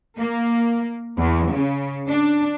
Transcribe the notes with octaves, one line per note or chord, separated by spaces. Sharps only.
A#3
E2
C#3
D4